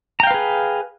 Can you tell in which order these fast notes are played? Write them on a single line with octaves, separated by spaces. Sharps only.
A#5 G5 F5 B4 G#4